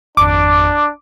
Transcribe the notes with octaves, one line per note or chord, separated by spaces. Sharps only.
G#1 F2 D4 D6